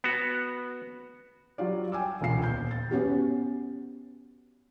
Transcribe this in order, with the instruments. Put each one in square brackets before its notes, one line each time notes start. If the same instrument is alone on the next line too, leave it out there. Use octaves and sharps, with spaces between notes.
[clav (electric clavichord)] B3 F#4
[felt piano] F#3 G3 F4 D5
G5 G#5 D6 E6
E1 C#2 F4 C7
D#1 G6
A6
[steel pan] B3 C#4 F#4 G4